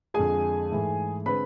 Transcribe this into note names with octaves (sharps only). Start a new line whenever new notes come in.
F2 D3 G#3 G#4 G#5
G#2 E3 A3
D3 G#3 C4 B4 B5